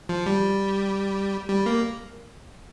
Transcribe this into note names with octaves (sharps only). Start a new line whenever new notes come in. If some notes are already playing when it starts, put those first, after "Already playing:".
F3
G3
G3
A#3